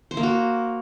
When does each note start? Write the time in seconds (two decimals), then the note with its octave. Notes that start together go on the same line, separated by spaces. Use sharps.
0.11 C5
0.17 A#3
0.23 F#4